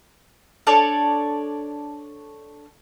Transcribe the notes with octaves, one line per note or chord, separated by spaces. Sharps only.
D4 A4 C#5 D5